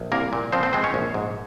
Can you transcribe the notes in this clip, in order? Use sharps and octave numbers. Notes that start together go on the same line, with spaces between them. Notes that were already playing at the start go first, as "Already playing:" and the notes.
Already playing: A#1
C2 A#3 A#4
A#2
F3 C4 C5
C4 C5
G#3 C4 C5
C#4 C#5
A#1
G#2